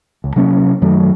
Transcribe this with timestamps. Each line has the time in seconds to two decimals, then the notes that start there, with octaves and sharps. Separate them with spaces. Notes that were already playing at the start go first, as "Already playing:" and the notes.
0.24 C#2
0.36 C3 F#3 A#3 C#4
0.82 F#2 D#3 F#3 A3